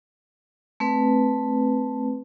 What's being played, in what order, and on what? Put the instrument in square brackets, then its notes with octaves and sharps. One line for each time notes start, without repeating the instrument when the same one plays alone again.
[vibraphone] A3 C4 B4